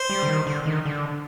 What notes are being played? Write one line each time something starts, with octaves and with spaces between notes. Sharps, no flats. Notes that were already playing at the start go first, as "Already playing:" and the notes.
Already playing: C5
G3
D3
D#3
D3
D#3
D3